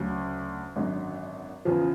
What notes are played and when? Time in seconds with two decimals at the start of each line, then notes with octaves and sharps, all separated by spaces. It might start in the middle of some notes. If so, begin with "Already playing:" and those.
Already playing: D2 C#3 F#3
0.76 G#1 F#2 D3 F#3
1.65 E2 C#3 F3 F4